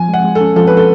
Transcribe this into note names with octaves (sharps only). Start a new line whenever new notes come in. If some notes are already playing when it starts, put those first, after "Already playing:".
Already playing: F3 G#5
G#3 F#5
G#3
A4
C#4
F3 A4
B4
A4